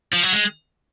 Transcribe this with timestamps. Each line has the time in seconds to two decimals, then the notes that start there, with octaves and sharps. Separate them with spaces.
0.12 F3
0.23 F#3
0.33 G#3